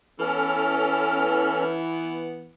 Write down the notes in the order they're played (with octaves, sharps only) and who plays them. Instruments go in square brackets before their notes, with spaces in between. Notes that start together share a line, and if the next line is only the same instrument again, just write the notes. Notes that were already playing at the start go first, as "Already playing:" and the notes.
[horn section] E3 B3 [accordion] C#4 A4 F6